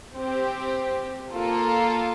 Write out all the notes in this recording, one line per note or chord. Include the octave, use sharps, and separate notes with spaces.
C4 G4
A#3 F4 A4